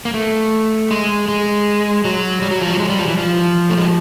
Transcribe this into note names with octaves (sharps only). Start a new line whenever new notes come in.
A#3
A3
G#3
G#3
F#3
G3
F#3
F3
F#3
G#3
G3
F3
E3
F3
A3
G#3